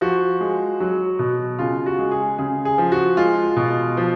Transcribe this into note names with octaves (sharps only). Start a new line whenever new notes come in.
F3 F#4
G#3
F#3
B2
C#3 F4
F#4
G#3
G#4
C#3 G#4
G#4
F3
F#4
G#3 F4
B2
F3